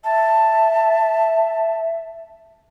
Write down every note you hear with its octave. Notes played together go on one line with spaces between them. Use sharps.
E5 A5